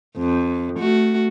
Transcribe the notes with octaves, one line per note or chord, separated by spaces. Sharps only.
F2
A3 F#4